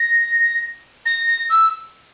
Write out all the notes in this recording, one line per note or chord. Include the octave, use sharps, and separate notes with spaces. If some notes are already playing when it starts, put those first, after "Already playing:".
Already playing: A#6
A#6
A#6
E6